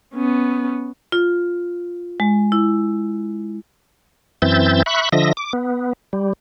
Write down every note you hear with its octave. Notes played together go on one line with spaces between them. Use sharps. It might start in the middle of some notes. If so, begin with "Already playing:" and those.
B3 C#4
F4
G#3
E4
F#2 E3 C4 E5 G6 A6
E5 B5 C#6 F#6
D3 F3 D#5 E5 A#6
D6
B3
G3